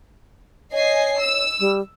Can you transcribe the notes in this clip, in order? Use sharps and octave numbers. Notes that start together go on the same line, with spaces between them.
C#5 D#5 G#5 C7
E6
G3